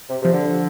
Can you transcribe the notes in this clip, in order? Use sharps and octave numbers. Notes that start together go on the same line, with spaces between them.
C3
C3 F3
D3